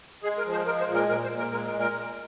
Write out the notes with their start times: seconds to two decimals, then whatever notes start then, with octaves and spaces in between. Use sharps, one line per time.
0.23 G#3 G#4
0.38 A#4
0.45 F3
0.52 C5
0.66 G#3 A#4
0.81 C5
0.87 A#2
0.94 A#4
1.09 A#2 A#4
1.24 C5
1.30 A#2
1.38 A#4
1.51 G#3 A#4
1.66 A#4
1.73 A#2
1.80 A#4
1.94 A#2